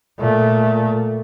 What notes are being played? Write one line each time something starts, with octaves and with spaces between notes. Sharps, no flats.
A#2 A3